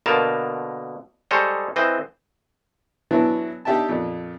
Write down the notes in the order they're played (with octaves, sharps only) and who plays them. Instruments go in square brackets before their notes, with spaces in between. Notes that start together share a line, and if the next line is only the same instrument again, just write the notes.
[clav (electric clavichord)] B2 D3 A#3 A#4 A5
G3 G#3 A4 C5 C#5 D#5
E3 C4 C5 D#5
[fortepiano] E3 F#3 B3 D4 E4
D4 D#4 G4 E5 G5 A5
F2 A#2